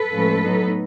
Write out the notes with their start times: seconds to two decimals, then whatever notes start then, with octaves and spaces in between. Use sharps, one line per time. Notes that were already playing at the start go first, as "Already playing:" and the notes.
Already playing: A4 B4
0.13 A2 F3 G#3 C#4
0.43 A2 F#3 B3 D#4